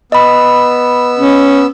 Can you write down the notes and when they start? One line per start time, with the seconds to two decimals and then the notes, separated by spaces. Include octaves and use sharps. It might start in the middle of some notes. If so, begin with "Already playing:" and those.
0.12 B3 D#5 B5 E6
1.19 C#4